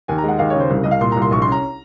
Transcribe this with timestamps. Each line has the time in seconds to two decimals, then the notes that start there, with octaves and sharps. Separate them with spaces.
0.08 D#2 G#5
0.18 A#5
0.23 G#3
0.28 F#5
0.39 D#2 F5
0.50 C#5
0.55 C#3
0.60 C5
0.70 C2
0.84 C2 D#5
0.91 F5
1.01 A#2 C6
1.12 A#5
1.17 C2
1.22 C6
1.31 A#1 C#6
1.42 C6
1.48 C#4 A#5